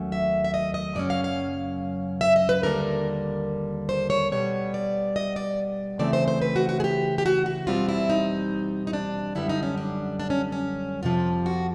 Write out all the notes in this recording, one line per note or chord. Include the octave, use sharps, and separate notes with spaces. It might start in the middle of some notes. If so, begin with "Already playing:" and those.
Already playing: D#2 F#3 A3 C#4
E5
E5
D#5
D#5
F#2 C#3 F#3 A#3 C#4 D5
F5
F5
E5
D#5
B4
D#2 D3 G3 A#3 A#4
C5
C#5
B2 G3 B3 C#5
D5
D#5
D5
C#3 E3 A3 C4 D5
C5
C5
B4
F#4
F#4
G#4
G4
G4
F#4
F#4
E2 B2 G3 C4 F4
E4
D#4
D#4
D4
F#2 D3 G3 B3 E4
D#4
C#4
D4
D4
C#4
C#4
F2 C3 F3 F4
F#4